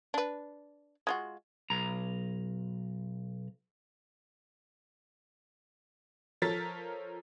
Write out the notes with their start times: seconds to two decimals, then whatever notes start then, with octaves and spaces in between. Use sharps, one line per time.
0.14 D4 B4
1.07 G#3 F4 F#4
1.70 B1 A#5
6.42 F3 A4 A#4 C#5 A6 B6